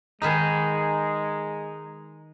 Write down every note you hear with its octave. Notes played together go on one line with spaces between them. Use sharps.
D#3 G#3 D#4 G#4 B4 D#5